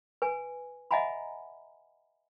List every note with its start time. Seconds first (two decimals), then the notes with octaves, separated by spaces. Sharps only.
0.22 B4 G#5
0.91 D#5 E5 F#5 G#5 A#5 B5